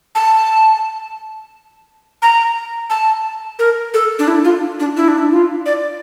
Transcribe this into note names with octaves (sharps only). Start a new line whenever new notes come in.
A5
A#5
A5
A#4
A4
D4
E4
F4
D4
E4
D4
E4
F4
D5